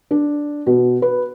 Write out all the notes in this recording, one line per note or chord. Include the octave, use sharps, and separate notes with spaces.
D4
B2
B4